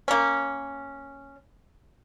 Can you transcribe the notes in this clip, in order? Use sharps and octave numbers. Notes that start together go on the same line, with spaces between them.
A#3 C#4